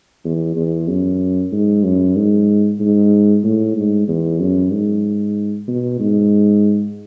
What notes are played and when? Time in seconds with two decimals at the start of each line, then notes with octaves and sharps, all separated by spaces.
0.24 E2
0.56 E2
0.88 F#2
1.52 G#2
1.84 F#2
2.16 G#2
2.80 G#2
3.44 A2
3.76 G#2
4.08 E2
4.40 F#2
4.72 G#2
5.68 B2
6.00 G#2